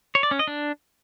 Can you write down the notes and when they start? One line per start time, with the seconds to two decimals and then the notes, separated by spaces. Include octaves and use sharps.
0.15 C#5
0.23 D5
0.31 C#4
0.39 D#5
0.47 D4